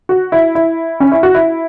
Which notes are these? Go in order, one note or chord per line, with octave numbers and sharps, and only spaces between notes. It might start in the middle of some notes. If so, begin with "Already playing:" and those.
F#4
E4
E4
C#4
E4
F#4
E4